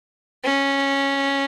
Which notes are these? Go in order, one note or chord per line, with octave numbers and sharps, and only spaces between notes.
C#4